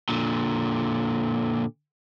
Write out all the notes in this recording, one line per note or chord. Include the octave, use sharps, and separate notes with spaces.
A#2 D3